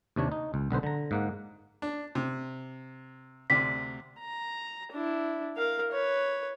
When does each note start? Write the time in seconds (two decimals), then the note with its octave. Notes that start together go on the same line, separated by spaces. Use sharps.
0.16 D#2 C3 D4 C#5
0.32 D#4
0.54 C#2
0.71 B1 D3 B4 C5
0.83 D3 A#5
1.11 G#2 A#3 F#5
1.82 D4
2.15 C3
3.50 D2 C3 D5 B6
4.20 A#5
4.92 D4 E4
5.56 A#4 F5
5.92 B4 C#5